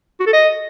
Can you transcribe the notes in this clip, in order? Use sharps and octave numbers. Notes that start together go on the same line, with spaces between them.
F#4
A4
D#5